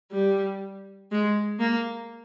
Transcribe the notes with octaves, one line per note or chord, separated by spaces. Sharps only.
G3
G#3
A#3